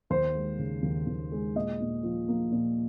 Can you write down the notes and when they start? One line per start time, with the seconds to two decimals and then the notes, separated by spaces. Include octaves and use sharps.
0.10 D#2 C5
0.35 G#3
0.58 C#3
0.82 D#2
1.07 D#2
1.32 G#3
1.55 A#2 D#5
1.80 A#2
2.03 F3
2.28 A#3
2.52 A#2